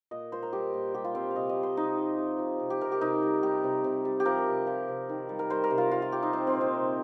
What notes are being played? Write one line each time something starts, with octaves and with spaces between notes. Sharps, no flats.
A#2 D#5
A#2 C5
A#4
G3 G4
A#2
G3 G4
F4
G3 C4
F5
C3 D#5
D#5
G3
C5
C3 D#4
F3
C3
F3
C3
G4
C3 A#4
G4
C3 D#4
G3
G3 G4
C3
C3
G3
G4
F3 A#4
C3
F3
C3
D#3
G3
A#4
G3 C5
A#4
C3
F4
F3 F4
F4
F3 G4
D#4
F3 C4
C4
A#2
D#4
C3